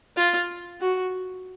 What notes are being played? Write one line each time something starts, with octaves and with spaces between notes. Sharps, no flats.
F4
F#4